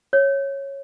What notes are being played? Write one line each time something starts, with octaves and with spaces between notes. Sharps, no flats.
C#5